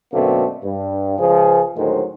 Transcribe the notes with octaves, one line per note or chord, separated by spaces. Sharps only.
F#2 B2 D3 A3 A#3 C4
G2
C#2 F3 G#4
D2 A2 D#3 F#3 G#3 C5